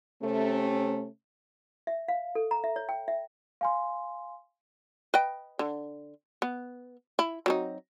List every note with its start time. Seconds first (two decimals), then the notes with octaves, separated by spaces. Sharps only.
0.22 C3 A3 C#4
1.87 E5
2.08 F5
2.35 A4
2.51 A#5
2.64 E5
2.76 C#5
2.89 G5
3.08 E5
3.61 F5 G#5 C6
5.14 B4 D#5 G5
5.59 D3
6.42 B3
7.19 E4
7.46 F#3 C4 D#4